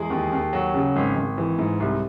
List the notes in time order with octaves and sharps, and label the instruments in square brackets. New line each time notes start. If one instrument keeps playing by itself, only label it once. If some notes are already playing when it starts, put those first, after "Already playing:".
Already playing: [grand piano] E2 G#3 G#4
D#2
D#2
F#3
C#3
G#1
G#1
E3
G#2
C2